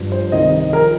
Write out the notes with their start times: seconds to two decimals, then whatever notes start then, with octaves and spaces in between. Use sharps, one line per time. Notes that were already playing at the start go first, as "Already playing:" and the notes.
Already playing: G2 F3
0.12 C5
0.32 C2 C3 D#3 G3 D#5
0.72 F3 A#4